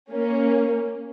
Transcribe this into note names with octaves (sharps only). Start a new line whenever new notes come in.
A#3 C#4